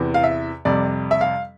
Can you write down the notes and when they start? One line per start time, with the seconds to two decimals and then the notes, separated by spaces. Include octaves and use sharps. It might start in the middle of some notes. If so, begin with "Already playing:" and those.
Already playing: E2 C3 E3
0.14 F5
0.23 E5
0.65 F2 C3 G3 D5
1.11 E5
1.21 F5